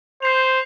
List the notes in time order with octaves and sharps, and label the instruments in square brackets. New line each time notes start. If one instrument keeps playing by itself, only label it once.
[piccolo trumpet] C5 [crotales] G6 C7 F7